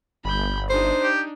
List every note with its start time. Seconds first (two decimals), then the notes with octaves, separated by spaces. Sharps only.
0.25 G1 B5 G6
0.69 D4 D#4 C5
1.02 G4